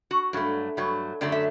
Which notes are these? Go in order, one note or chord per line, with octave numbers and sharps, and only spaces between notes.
F#4
G2 F#3 A3
G2 F#3 A3
F#2 D3 F#3 A3 D5
E5